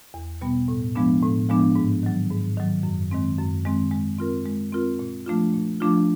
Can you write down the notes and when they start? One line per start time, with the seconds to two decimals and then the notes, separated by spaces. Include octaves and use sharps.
0.14 E2
0.41 B2 G3 B3
0.68 A2
0.95 F3 G#3 B3 D4
1.22 A2
1.49 F3 G#3 B3 D4
1.75 G#2
2.03 D#3 F#3
2.31 G#2
2.57 D#3 F#3
2.83 F#2
3.11 D#3 G#3 C4
3.38 F#2
3.65 D#3 G#3 C4
3.91 G#3
4.18 C4 F4 A#4
4.45 G#3
4.72 C4 F4 A#4
4.99 A#2
5.26 F3 A3 D4 F4
5.54 A#2
5.80 F3 A3 D4 F4